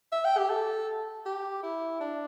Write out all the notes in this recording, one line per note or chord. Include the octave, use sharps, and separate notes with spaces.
E5
G5
G4
A4
G4
E4
D4